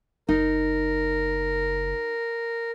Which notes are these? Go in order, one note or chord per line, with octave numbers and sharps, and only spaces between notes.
F#1 D#4 A#4